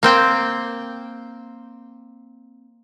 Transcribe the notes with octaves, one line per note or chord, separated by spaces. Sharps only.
A#3 C4 G5